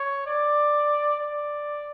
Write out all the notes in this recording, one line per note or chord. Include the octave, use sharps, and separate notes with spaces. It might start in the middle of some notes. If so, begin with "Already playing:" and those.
Already playing: C#5
D5
D5